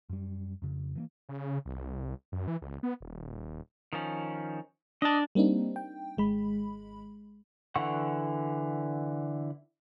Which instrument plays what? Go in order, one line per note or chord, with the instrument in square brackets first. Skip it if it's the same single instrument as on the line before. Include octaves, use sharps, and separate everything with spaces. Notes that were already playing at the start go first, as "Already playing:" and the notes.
[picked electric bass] F#2 G3
F2 C#3
E3 A3 A#3
[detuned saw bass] C#3
C2
F#2
E3
C#2
B3
D#1
[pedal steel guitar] D#3 F3 C#4
[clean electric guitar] D4 A5 [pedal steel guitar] D#5
[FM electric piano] G3 A#3 C4 D4 D#4
G5
G#1 G#3 B5
[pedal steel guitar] D3 E3 F#5 C#6